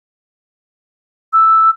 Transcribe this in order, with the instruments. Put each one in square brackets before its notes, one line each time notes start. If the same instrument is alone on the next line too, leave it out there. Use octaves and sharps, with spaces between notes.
[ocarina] E6